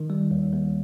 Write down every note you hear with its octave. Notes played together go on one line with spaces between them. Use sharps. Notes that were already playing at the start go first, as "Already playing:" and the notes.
Already playing: D#3
G3
D#2
D#2